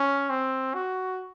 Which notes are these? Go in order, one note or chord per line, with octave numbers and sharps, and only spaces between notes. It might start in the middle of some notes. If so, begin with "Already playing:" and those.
Already playing: C#4
C4
F#4